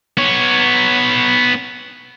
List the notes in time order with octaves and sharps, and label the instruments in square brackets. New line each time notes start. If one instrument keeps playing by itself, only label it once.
[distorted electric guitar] B3 C#5